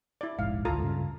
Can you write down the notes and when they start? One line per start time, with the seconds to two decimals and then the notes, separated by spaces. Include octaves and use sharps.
0.21 E4 D5
0.39 E1 A#1 G#2 F5
0.65 G#1 D2 F4 A4 A#5
0.80 G2 A#2 C#3